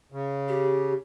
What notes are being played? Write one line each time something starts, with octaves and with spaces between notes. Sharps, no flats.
C#3
G4